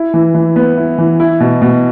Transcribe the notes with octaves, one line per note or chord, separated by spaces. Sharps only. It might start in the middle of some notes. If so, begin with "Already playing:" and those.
Already playing: E4
E3
E3
B3
E4
E3
E4
B2
B2